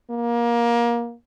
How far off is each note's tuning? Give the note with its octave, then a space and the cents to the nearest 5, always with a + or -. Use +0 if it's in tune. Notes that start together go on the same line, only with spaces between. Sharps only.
A#3 +20